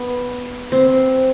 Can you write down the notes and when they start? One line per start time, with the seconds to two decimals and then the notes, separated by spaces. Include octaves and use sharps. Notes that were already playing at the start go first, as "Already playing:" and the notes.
Already playing: B3
0.72 C4